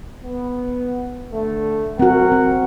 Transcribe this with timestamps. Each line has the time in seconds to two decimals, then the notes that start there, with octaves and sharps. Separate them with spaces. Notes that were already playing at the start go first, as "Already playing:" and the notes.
0.23 B3
1.32 D3 A3
1.99 C4 F#4 A#4 F#5
2.32 C4